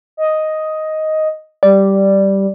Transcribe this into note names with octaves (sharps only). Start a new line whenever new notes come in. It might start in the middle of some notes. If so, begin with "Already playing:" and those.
D#5
G3 D5